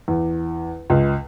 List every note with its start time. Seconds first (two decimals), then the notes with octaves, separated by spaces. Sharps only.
0.08 E2
0.90 C#2